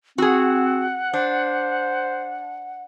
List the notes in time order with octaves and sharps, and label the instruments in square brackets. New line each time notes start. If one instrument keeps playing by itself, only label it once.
[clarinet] C4 [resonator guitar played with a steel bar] F#4 G#4 [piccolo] F#5
[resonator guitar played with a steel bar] D4 [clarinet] C5